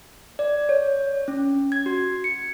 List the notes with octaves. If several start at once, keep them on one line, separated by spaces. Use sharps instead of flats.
D5
C#5
C#4
G#6
F#4
C#7